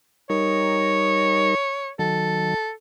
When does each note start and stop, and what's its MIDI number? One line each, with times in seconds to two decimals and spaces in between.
0.30 1.55 55
0.30 1.55 63
0.30 1.55 70
0.30 1.90 73
1.99 2.54 51
1.99 2.54 54
1.99 2.71 69